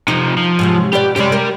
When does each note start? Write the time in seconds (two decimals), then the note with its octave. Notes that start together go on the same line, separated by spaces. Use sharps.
0.08 C3 F3 D#4
0.37 F3
0.59 G#2 C3 F#3
0.93 B2 G4 B4 D5
1.16 F#2 C3 G#3 G4 D5
1.32 A#4